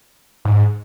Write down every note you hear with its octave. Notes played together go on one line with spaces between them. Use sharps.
G#2